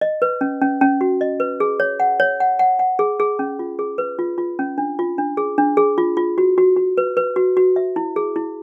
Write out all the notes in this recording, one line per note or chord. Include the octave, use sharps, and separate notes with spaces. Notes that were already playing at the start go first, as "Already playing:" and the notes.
D#5
B4
C#4
C#4
C#4
F#4
D#5
B4
G#4
C#5
F#5
C#5
F#5
F#5
F#5
G#4
G#4
C#4
F4
G#4
B4
F4
F4
C#4
D4
F4
D4
G#4
D4
G#4
F4
F4
F#4
F#4
F#4
B4
B4
F#4
F#4
E5
E4
G#4
E4